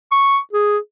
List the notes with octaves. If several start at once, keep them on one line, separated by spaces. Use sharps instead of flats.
C#6
G#4